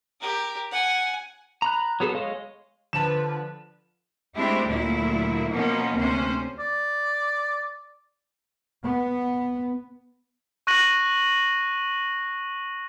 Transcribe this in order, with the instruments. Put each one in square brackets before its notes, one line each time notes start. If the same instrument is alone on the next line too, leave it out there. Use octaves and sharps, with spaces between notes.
[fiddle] G4 A#4
F#5 G#5
[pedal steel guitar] A#5 B5 F#6
F#3 B3 G#4 A4
G#3 C#5 D#5 F5
[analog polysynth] D3 F3 B4 [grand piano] A5 E7
[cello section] G#3 A3 C4 D4 E4 G4
D2 A#2 F#3 E4
B2 F3 A#3 B3 C#4 D#4
D2 C3 C#4 C5
[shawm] D5
[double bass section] B3
[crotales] C#6 F#6 A#6 D#7 F#7